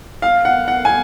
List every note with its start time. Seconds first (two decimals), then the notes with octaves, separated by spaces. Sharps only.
0.22 F5
0.45 F#5
0.68 F#5
0.85 G#5